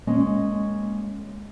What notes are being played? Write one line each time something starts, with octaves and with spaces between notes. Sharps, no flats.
G#3 A#3 C#4 D#5